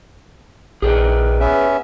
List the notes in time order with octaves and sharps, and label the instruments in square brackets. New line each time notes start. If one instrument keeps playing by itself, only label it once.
[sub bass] A#1 [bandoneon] D#3 [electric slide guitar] G#4 B4 D5
[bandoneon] B3 C#4 E5